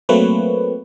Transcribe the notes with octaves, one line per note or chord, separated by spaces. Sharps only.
F#3 A3 A#3 C4 B4 C#5